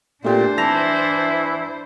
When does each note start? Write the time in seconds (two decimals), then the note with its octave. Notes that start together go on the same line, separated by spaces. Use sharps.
0.24 A#2 A3 D4 G4 C5
0.58 E3 E4 A5 A#6 F7